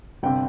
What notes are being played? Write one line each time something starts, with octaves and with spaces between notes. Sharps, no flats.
G1 C3 G5